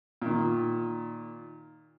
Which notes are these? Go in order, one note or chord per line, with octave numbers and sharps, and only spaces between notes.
A#2 D#3